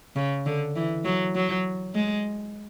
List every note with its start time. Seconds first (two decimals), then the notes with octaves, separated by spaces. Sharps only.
0.16 C#3
0.46 D3
0.76 E3
1.05 F#3
1.35 F#3
1.95 G#3